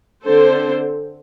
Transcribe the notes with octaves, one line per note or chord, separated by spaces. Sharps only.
D3 C4 A4 C5